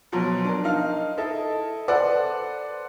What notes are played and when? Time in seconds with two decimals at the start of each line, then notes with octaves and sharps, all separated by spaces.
0.12 B2 F3 F#3 C6
0.44 D4 A#4
0.64 D#4 F5
1.18 E4 A4 D#5
1.88 A4 B4 C5 D5 F#5